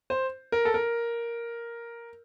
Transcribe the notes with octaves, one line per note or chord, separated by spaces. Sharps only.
C5
A#4
A4
A#4